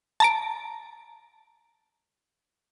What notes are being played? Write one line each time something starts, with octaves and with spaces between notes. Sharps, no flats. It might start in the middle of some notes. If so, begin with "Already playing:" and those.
A5 A#5 D7